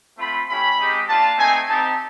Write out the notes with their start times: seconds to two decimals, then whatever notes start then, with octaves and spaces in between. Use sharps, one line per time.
0.17 A3 C4 F4 B5
0.48 A3 C#4 E4 G4 B5
0.78 G#3 C4 D#4 G4
1.08 A#3 D4 F4 A5
1.38 A3 C4 D#4 G#5
1.68 C4 D#4 G4 A5